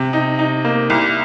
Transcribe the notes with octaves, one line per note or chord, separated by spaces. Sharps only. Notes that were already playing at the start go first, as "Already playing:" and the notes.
Already playing: C3
D#4
D#4
A#3
C2